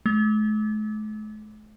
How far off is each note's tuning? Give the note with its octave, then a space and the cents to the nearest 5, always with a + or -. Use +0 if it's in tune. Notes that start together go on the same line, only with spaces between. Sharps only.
A3 -45